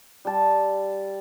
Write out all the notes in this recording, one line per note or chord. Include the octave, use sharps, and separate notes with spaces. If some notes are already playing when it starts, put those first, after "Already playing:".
G3 A5